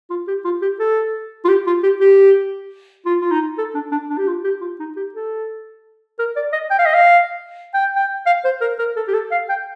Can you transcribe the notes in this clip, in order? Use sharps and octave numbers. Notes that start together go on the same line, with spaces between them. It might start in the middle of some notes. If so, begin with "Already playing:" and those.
F4
G4
F4
G4
A4
F4
G4
F4
G4
G4
F4
F4
D#4
A4
D4
D4
D4
G4
F4
G4
F4
D#4
G4
A4
A#4
D5
D#5
G5
F5
D#5
F5
G5
G5
F5
C5
A#4
A#4
A4
G4
A4
F5
G5